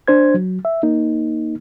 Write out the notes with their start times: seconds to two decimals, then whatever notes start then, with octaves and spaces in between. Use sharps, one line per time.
0.08 D4 C5 G#6
0.34 F#3
0.65 E5
0.83 A#3 D#4